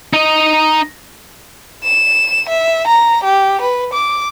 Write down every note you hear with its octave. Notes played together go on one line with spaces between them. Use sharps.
D#4 D#5
E7
E5
A#5
G4
B4
D6